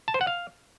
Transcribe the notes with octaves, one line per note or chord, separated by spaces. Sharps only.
A5
C5
F#5
F5